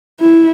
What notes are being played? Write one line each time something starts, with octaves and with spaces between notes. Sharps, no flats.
E4